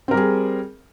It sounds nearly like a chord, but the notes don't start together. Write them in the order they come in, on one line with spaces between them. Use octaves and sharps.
C4 A#4 G3 G#4